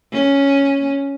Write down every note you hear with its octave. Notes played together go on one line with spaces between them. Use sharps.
C#4